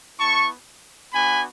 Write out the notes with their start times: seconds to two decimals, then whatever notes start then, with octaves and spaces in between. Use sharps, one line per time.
0.19 B3 E4 A5 C#6
1.13 B3 D4 F#4 G#5 B5